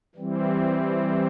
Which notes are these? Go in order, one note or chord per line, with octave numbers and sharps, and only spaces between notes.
E3 G3 C4